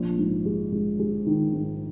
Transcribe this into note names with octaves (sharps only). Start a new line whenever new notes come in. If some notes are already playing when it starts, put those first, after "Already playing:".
Already playing: A#1
G#2
G#3
G#3
G#3
D#3
G#2